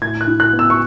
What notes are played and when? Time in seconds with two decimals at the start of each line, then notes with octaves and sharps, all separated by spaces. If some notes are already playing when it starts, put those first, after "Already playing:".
0.02 A2 G#6
0.21 F#6
0.27 E4
0.40 F#6
0.53 B3
0.59 E6
0.70 C#6